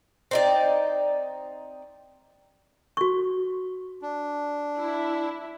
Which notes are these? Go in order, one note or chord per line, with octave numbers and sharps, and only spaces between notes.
C4 D#4 D5
F#4 C#6
D4
E4